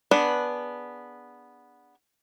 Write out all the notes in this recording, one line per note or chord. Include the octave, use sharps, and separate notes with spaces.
B3 D4 G#4 F#5